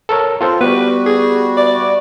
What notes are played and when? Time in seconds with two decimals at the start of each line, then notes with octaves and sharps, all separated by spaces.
0.09 A4 A#4 C#5
0.41 C4 F4 A4 C5
0.61 G3 B3 F#4 G4 B4
1.06 G#4
1.57 D5